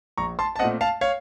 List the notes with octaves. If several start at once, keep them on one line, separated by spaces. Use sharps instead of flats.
A#1 A#5 C#6
A5 C6
A5
A#2 A3 C4 D#5 F#5
F5 A5
C#5 F5